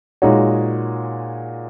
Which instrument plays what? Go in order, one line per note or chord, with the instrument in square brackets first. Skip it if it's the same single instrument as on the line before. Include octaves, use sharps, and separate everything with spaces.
[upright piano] A#2 G#3 D#4 F#4 C#5